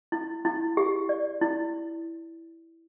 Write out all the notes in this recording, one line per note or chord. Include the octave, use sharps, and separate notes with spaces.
E4
E4
G4
D5
E4